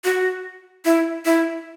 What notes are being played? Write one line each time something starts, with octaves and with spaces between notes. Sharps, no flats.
F#4
E4
E4